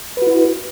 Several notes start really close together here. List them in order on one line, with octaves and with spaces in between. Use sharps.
B4 F#4 E4